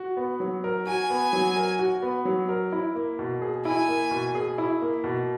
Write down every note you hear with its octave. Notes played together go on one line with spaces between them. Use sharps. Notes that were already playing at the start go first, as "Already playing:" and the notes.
Already playing: F#4
B3
F#3
A#4
F#4 G#5
B3
F#3
A#4
F#4
B3
F#3
A#4
E4
A#3
B2
G#4
E4 G#5
A#3
B2
G#4
E4
A#3
B2